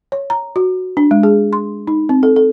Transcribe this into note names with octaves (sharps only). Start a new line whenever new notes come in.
C#5
A#5
F#4
D4
G#3
G#4
C6
D#4
C4
A4
A4